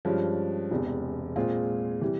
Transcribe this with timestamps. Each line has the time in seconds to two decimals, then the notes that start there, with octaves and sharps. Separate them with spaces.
0.05 G2 F3 G#3 C#4
0.71 E1 E2 C3
1.36 A#2 G#3 C4 F4 G#4
2.01 C3 E3 G3